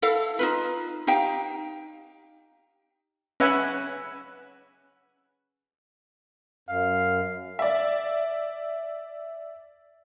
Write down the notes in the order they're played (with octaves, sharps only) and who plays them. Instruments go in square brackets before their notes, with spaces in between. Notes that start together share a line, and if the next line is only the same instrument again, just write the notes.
[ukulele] E4 A4 F5
D#4 F4 B4
D#4 G4 F5 G5
[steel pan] C#4 B4 E5 F#5 G#5
[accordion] F#2 [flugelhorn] F5
[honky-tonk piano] D5 E5